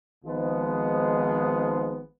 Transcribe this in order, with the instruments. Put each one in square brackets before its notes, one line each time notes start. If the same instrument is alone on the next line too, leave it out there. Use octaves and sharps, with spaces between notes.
[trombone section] G#1 G#2 F3 G#3 B3